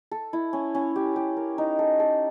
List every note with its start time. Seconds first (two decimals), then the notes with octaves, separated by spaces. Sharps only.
0.11 A4
0.33 E4
0.53 C#4
0.75 C#4
0.96 G4
1.16 G4
1.37 A#4
1.58 D#4
1.79 A4
2.00 A4